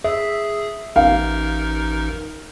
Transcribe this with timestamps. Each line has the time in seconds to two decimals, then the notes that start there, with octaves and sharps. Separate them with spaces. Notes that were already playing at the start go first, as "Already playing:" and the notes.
0.04 G#4 E5
0.96 A1 D#4 A#4 F5